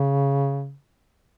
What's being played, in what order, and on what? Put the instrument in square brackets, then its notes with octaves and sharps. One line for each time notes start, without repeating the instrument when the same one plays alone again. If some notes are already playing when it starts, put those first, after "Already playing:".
Already playing: [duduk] C#3